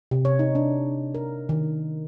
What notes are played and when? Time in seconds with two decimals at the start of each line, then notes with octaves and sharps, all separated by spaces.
0.11 C3
0.25 C#5
0.39 D#4
0.55 D4
1.15 A#4
1.49 D#3